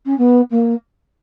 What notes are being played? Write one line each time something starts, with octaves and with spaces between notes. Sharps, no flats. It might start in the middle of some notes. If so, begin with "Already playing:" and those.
C#4
B3
A#3